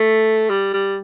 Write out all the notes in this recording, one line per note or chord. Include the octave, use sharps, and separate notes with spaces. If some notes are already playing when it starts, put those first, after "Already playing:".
Already playing: A3
G3
G3